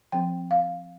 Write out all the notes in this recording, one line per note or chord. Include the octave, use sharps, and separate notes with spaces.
F3 C4 G5
F5